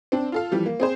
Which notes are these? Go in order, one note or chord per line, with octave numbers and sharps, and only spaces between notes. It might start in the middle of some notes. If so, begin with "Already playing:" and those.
C4 D4
F4 A4 F5
E3 F3 G3
A#3
C4 G#4 C5